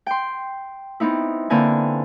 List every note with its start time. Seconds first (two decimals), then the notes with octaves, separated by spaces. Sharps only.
0.07 G5 C6
1.00 B3 C4 D#4 E4
1.50 D3 A#3 C4 B4 G#5